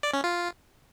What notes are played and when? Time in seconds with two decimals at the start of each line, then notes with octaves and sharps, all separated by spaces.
0.03 D5
0.14 C#4
0.24 F4